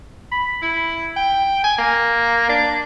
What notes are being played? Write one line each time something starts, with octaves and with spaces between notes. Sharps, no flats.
B5
E4
G5
G#5
A#3
D4